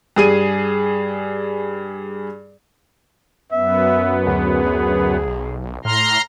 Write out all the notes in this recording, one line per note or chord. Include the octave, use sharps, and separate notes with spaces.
G2 G#4 D#7
F#2 B3 E5
D2 G#4
B1
A2 A#5 C6 F6